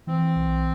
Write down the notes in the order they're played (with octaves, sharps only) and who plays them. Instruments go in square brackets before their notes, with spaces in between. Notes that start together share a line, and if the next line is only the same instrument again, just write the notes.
[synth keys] E3 [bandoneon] C4
[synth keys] B1